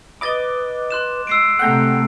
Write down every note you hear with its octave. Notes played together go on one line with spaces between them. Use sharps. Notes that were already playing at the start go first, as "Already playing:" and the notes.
B4 D#5 B5 D6 A6 G7
C6 F#6 E7
G#3 E6 C7 D7
C3 A3 F#5 G5 A#5